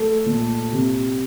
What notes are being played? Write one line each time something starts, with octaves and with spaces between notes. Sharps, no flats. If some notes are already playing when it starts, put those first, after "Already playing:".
Already playing: A3 A4
A#2
C3